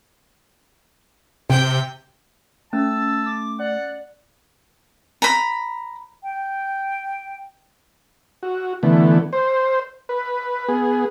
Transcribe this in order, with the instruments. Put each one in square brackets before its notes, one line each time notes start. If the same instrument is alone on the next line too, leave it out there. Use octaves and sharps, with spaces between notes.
[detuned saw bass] C3 [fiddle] G5
[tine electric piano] A3 [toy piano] C#4 [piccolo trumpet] A5 [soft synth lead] E6
[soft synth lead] D6
[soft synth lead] D5 [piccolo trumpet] F#5
[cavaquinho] A#5 B5
[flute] G5
[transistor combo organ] F#4
D3 E3 A3 B3
C5
B4
B3 G#4